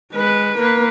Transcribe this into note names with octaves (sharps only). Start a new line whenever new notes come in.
G#3 B4
A#3 B4